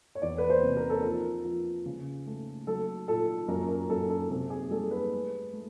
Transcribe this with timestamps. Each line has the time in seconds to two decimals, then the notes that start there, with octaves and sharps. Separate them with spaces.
0.15 C#5
0.22 E2 D5
0.38 B4
0.50 C5
0.63 C3
0.77 A#4
0.90 A4
1.03 F3 A#4
1.45 F3
1.86 C#3
2.27 A3
2.67 F#3 A4
3.08 A#2 A4
3.48 F#2 A#4
3.68 A#4
3.89 F#2 A4
4.10 A4
4.30 C3 A4
4.50 G#4
4.71 G3 A4
4.91 B4
5.11 A3
5.53 A3